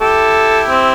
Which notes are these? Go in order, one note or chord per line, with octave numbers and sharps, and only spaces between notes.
E4 G4 A4
C4